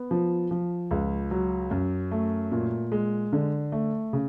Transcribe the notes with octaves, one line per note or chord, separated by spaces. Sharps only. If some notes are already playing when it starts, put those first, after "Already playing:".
Already playing: B3
F3
F3
C#2
F#3
F#2
A3
A#2
G#3
D3
A3
C#3